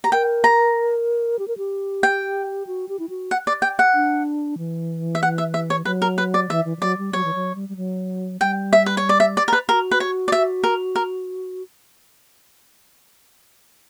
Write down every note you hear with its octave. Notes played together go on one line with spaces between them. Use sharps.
G4 A#5
A#4 G5
A#5
G4
A#4
G4
G5
F#4
G4
E4
F#4
F#5
D5
G5
F#5
D4
E3
E5
F#5
E5
E5
C#5
F#3 B4
A#4
B4
D5
E3 E5
E3
E3
F#3 D5
G3
F#3 C#5
E3
F#3
G3
G3
F#3
G3 G5
E5
B4
C#5
D5
E5
D5
A#4
B4
F#4 A#4
B4
C#5
D5
E5
A#4
A#4